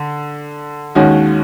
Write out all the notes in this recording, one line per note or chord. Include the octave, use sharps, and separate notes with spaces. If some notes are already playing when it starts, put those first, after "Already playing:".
Already playing: D3
D#2 D#3 G#3 C#4 F#4